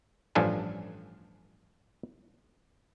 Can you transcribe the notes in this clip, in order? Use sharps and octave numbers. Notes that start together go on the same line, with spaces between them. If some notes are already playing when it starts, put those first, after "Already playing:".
A1 G2 F3 D4 A4 G#5